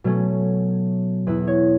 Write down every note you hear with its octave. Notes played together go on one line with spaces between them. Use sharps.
B2 F#3 A3 C#4
E2 B2 B3 E4 B4
C#5